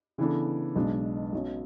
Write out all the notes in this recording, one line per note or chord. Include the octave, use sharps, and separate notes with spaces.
C#3 E3 B3 D4 A4
B1 B2 G#3 D4
B1 B2 F#3 C#4 F#4